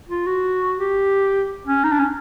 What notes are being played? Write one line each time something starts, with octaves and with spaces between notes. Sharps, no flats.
F4
F#4
G4
C#4
D#4
D4
C#4